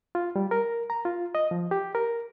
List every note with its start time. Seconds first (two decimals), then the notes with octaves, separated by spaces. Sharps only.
0.15 F4
0.36 G3
0.51 A#4
0.90 A#5
1.05 F4
1.35 D#5
1.51 F3
1.71 G4
1.95 A#4